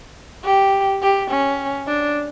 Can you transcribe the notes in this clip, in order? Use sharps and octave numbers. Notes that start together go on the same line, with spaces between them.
G4
G4
C#4
D4